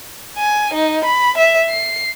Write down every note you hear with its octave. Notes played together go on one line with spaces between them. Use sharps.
G#5
D#4
B5
E5
C7